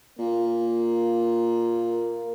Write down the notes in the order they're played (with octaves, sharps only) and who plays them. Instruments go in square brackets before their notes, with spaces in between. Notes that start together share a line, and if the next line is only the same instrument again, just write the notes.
[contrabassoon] A#2 [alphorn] A#3